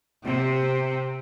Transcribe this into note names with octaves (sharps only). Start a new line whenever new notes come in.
C3